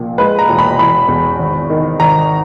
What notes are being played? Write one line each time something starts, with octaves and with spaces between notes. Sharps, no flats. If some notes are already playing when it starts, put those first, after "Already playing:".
Already playing: A#1 A#2
G#3 B4
A#5
E1
B5
E3 B5
E2
G#1
D#3
G#1 A#5